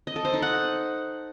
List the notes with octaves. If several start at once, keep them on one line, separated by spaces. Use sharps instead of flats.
D#5
A4
C5
D#4
F#5